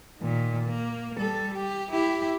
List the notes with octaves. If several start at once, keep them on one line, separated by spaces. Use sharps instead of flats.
A#2 D#3
A#3
G3 A4
G4
E4 G4